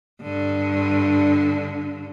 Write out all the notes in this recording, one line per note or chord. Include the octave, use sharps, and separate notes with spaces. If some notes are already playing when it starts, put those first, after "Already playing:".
G2 D3